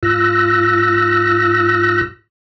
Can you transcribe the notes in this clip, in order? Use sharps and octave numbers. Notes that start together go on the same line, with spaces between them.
G#2 F4 E6 F#6 A#6